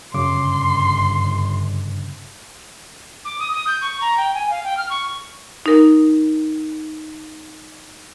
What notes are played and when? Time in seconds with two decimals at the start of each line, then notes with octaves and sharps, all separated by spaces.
0.14 G1 F#2 C#3 C6 D6
3.25 D6
3.39 D#6
3.53 D#6
3.67 G6
3.81 C#6
4.01 A#5
4.17 G5
4.35 G#5
4.50 F5
4.64 G5
4.77 F6
4.90 C#6
5.66 D#4 A#4